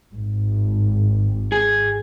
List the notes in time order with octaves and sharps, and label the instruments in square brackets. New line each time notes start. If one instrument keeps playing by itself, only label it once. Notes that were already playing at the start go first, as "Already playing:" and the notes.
[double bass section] G#1
[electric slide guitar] G#4